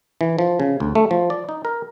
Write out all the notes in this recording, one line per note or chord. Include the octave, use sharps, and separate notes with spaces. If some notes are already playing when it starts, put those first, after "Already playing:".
E3
F3
C#3
D2
A3
F3
D5
D#4
A#4